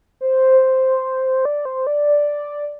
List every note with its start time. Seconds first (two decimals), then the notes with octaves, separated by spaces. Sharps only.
0.21 C5
1.45 D5
1.65 C5
1.87 D5